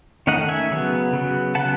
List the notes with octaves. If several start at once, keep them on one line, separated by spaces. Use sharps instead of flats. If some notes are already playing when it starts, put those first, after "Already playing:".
D#3 A3 C#4 D#5 F#5
E5 G#5
C#3 F#3 B3
C#3 F#3 B3
C#3 F#3 B3 F#5 A5